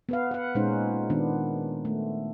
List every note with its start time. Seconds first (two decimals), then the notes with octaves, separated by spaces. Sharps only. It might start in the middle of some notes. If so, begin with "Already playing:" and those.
0.09 B3 B4 F5
0.31 B4 F#5
0.55 A#2 G#3 C#4 D#4 C5
1.10 D#3 B3 D4
1.85 A3